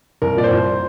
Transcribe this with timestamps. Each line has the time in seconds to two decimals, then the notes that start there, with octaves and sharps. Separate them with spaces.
0.22 C2 A#4
0.36 A#2 D5
0.44 C5
0.51 C2